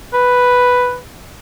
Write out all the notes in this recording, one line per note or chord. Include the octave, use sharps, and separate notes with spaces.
B4